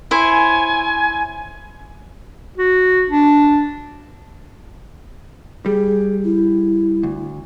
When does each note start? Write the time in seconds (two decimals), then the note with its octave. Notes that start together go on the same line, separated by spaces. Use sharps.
0.11 E4 C5 C#5 G#5
2.58 F#4
3.09 D4
5.66 G3 G#4
6.25 E4
7.03 D2